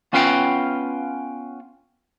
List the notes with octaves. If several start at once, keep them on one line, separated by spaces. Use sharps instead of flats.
B3 C#4 F4 B4 F5 G5